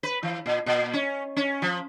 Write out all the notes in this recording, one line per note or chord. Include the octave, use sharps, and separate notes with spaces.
B4
E3
A#2
A#2
C#4
C#4
F3